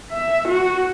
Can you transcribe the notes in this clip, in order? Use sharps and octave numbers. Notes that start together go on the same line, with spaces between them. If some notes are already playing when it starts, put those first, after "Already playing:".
E5
F#4